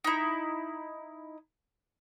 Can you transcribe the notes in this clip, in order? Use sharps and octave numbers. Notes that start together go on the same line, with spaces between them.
D#4 E4